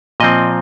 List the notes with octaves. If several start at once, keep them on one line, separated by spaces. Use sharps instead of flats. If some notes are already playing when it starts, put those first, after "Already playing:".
A#2 F3 C4 D#5